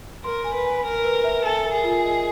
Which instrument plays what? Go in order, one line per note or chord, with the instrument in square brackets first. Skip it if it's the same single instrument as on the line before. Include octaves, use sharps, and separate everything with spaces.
[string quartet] A#4 [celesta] C6
[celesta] G#5
[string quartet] B4
[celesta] G#5
[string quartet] A#4 [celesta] G#5
[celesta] B4
E5
[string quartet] A4 [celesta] G#5
[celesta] A#4
[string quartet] G#4
[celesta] F4
D#5